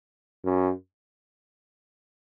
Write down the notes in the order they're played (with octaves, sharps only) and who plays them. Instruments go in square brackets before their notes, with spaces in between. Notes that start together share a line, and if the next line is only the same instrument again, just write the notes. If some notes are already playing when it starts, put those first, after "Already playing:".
[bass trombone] F#2